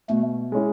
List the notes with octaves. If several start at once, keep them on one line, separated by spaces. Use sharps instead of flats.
B2 A3
G#3 C#4 E4 G#4